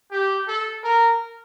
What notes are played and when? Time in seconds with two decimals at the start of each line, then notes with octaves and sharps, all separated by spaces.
0.11 G4
0.48 A4
0.84 A#4